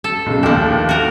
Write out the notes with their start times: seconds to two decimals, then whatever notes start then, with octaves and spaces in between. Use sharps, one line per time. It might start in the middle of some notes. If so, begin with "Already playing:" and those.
0.04 A4
0.26 B1 C#3
0.43 D#2 F3 A3 D4
0.89 F#4 A#4